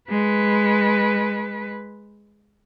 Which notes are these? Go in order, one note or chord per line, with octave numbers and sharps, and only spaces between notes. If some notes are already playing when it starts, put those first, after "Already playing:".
G#3 B4